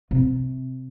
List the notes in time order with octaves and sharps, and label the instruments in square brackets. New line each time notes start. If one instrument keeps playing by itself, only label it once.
[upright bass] C3